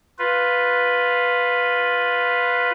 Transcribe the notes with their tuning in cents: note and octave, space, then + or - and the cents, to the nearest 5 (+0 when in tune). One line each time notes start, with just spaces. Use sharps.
F4 +5 B4 +0